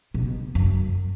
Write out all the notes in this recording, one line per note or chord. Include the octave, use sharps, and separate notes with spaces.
B2
F#2